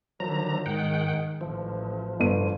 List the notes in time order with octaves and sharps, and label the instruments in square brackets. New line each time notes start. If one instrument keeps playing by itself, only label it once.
[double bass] D3 D#3 [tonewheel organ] F3 F#3 A#5
[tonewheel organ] G#2 F#5 G5 [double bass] D#3 G#3
[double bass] A1 [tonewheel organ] F3
[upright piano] G1 D#7